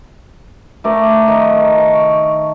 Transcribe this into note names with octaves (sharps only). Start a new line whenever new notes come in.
A3 A#4 D5
D#3
C#6